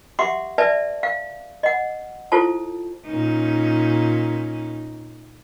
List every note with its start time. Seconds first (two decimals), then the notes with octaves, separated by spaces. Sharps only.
0.19 G4 E5 F#5 C6 D6
0.58 B4 D5 E5 A5
1.03 F5
1.63 D#5 F#5
2.32 E4 F4 A4 C5 A5
3.07 A#2 C#4 D#4